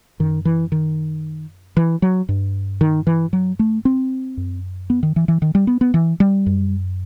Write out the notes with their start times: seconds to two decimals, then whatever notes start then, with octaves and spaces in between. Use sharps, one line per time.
0.19 F#2 D#3
0.45 E3
0.72 D#3
1.77 E3
2.02 F#3
2.29 G2
2.81 D#3
3.07 E3
3.33 F#3
3.59 A3
3.85 C4
4.37 F#2
4.90 B3
5.03 D#3
5.16 E3
5.28 E3
5.42 D#3
5.55 G3
5.67 B3
5.81 B3
5.94 E3
6.20 G3
6.46 F#2